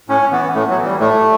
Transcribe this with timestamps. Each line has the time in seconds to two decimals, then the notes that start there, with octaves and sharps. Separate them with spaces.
0.09 A2 C#4
0.32 E3 B3
0.54 A2 A3
0.70 F#3
0.77 E3
0.85 G3
1.00 A2 A3